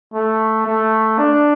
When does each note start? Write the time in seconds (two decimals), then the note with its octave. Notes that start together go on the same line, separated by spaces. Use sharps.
0.14 A3
0.67 A3
1.19 D4